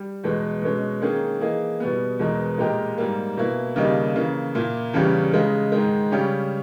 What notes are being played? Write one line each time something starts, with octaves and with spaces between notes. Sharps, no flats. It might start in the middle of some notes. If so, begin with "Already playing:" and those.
Already playing: G3
E2 B2 G#3
B2 G#3 C#4
D#3 A#3 C#4 G#4
E3 A#3 D#4 G#4
B2 G3 B3
E2 B2 G#3 D#4 A#4
A#2 G#3 D#4 G4 A#4
G#2 G3 A#3
B2 A#3 E4
D#2 C#3 G3 A#3 D#4
C#3 E3 A#3
A#2 A#3 E4
E2 C#3 G3 C#4 G4
C#3 G#3 D#4
G#2 D#3 G#3
C#3 G3 C#4 G4